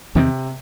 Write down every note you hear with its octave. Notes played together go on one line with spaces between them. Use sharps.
E2 C3 D#3 A3 C4